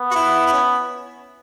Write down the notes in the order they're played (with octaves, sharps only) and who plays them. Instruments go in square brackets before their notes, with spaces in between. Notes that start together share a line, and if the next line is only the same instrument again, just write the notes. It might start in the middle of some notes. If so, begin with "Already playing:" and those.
Already playing: [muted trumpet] B3
[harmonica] F#4
E4
E4
C#4